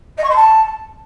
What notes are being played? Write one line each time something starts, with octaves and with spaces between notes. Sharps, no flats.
D#5
C#6
C6
A5